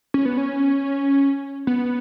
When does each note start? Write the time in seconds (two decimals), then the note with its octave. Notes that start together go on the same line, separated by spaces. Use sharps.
0.14 C#4
0.25 B3
0.37 C#4
1.67 B3